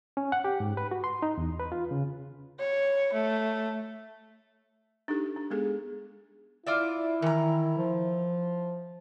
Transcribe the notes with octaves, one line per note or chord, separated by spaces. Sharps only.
C#4
F#5
G4
G#2
B4
F#4
C6
D#4
E2
B4
F4
C#3
C#5
A3
D4 D#4 G4 A4
D4
G#3 B3 G#4 A4
E4 F4 D5 E5
D#3 E3 A#5
F3